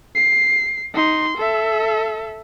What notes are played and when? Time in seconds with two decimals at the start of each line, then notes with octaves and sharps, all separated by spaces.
0.15 C7
0.95 D#4 C6
1.38 A4 E5